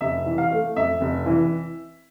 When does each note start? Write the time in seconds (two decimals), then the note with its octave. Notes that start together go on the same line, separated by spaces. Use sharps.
0.01 F1 E5
0.26 E3
0.38 F5
0.51 A3
0.76 F2 E5
1.01 F1
1.26 E3